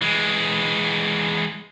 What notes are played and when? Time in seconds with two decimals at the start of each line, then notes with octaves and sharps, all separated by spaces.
0.02 E3 G#3